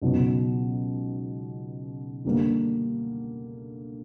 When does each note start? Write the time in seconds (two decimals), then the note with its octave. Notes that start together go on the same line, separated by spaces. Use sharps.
0.01 C#2 B2 F#3 B3 D#4
2.25 D3 G3 A#3